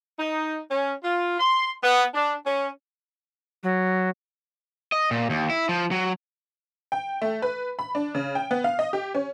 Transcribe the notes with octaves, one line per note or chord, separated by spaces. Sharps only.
D#4
C#4
F4
C6
B3
D4
C#4
F#3
D#5
A#2
D#2
E4
F3
F#3
G5
A3
B4
B5
D4
C#3
G5
B3
F5
D#5
G4
C#4